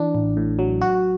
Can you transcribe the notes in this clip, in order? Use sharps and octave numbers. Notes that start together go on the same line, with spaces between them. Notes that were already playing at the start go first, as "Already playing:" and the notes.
Already playing: E3 D4
A1
A2
F#3
F#4